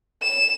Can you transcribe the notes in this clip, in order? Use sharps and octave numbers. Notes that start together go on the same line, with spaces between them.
E7